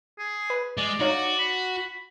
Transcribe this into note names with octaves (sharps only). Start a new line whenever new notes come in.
G#4
B4
G#3 D5
D#4 F#4 C#5 F5
B5